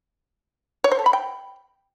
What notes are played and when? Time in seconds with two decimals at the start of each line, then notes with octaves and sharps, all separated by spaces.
0.84 C#5
0.92 C5
0.99 A4
1.06 B5
1.13 G5